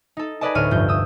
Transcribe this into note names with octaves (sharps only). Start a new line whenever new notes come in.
D#4 A4
G#4 A#4 B4 D5 D#5 A5
D2 A2 C#5 F6 D#7
F1 G2 F4 G6
D#6 E6